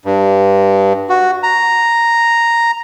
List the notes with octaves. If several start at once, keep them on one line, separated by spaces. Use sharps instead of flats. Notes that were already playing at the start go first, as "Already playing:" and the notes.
G2
F#4
A#5